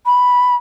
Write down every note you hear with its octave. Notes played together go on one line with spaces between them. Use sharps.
B5